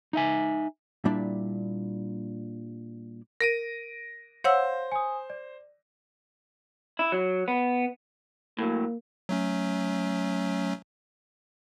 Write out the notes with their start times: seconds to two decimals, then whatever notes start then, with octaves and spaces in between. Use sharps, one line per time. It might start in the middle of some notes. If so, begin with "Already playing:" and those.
0.13 D#4 E5 G#5
1.05 A#2 G3 D4 E4 D5 E5
3.41 A#4 A#6 D7 D#7
4.44 C5 C#5 F5 F#5 E6
4.92 G#5 D#6
5.30 D5
6.99 E4
7.12 F#3
7.48 B3
8.59 A2 F#3 A#3
9.29 F#3 A3 C#4